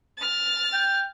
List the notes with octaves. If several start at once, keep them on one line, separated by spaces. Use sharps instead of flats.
F6 A6
G5